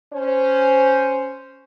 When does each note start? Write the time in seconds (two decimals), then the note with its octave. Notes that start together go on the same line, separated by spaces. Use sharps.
0.13 C#4 C5